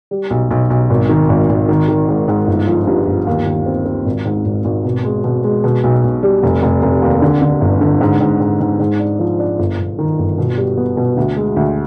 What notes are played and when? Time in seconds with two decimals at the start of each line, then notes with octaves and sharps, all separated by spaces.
0.11 G3
0.30 B1
0.51 B1
0.70 B1
0.90 G#1
1.09 D#3
1.29 G#1
1.49 G#1
1.69 D#3
1.88 D#3
2.08 G#2
2.28 G#2
2.47 G1
2.67 F3
2.87 G2
3.07 G1
3.27 D#2
3.46 D#3
3.66 C4
3.85 C4
4.06 G#1
4.25 G#2
4.45 G#1
4.65 G#1
4.85 B2
5.05 G#3
5.24 B2
5.44 G#3
5.64 B2
5.84 B1
6.03 B1
6.23 G3
6.43 F1
6.63 F1
6.83 F1
7.02 D#2
7.22 D3
7.42 D3
7.61 G1
7.81 D3
8.01 G#2
8.21 G#2
8.40 G#2
8.60 G#2
8.80 G#2
9.00 D4
9.19 F3
9.39 D4
9.59 G1
9.79 G1
9.99 D#3
10.19 G1
10.38 B2
10.57 G3
10.77 B3
10.97 B2
11.17 D2
11.36 G#3
11.56 D2